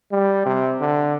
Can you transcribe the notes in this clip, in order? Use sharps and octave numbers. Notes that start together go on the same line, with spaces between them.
G3
C3
D3